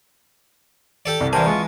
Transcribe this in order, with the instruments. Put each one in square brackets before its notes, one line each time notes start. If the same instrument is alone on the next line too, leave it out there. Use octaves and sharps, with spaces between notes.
[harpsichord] G4 A4 D5
[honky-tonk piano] C2
[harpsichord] E3 G#5 [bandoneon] G3 A#4 C5 [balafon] A5
[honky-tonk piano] G#3 [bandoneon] F4 C#6